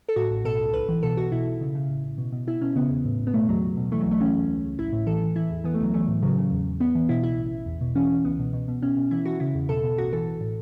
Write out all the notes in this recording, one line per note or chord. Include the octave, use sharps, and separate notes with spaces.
A4
A2 F#4
A1
B2 A4
C#2
B1 B4
E3
B2 A4
B1 F#4
B2 E4
B1
C#3
C#3
A1
A1
B2
B2
B2 E4
B2 C#4
C#3 B3
E2
A2
A1
B3
B2 A3
E2 F#3
C#2
B2
E3 A3
F#3
B1
A3
E3 C#4
E2
C#2
C#2
A1 E4
A2
E3 A4
E3
E3 E4
E2
E3 B3
A3
C#2 F#3
E3 A3
A2
C#3 F#3
C#3
E2
E2
A1 B3
E3
B2 E4
C#2 E4
A1
A1
E2
B2
E3 C#4
E3
C#2 B3
B2
B2
B2
B2 C#4
B2
E3 E4
E3 F#4
C#3 E4
E2
B2 A4
B2
A1 F#4
E3 A4
A1
A2